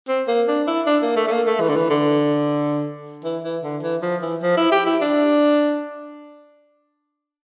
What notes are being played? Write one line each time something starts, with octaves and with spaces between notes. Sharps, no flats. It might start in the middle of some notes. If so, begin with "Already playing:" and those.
C4
A#3
D4
E4
D4
A#3
A3
A3
A#3
A3
E3
D3
E3
D3
E3
E3
D3
E3
F3
E3
F3
E4
G4
E4
D4